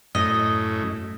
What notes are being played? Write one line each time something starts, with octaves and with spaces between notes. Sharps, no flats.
F#2 A2 D#5